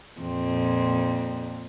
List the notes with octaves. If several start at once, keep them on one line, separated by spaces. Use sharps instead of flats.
F2 A#2 C4